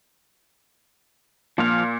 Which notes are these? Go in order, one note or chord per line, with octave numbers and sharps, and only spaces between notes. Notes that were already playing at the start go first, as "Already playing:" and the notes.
A#2 F3 F5 F6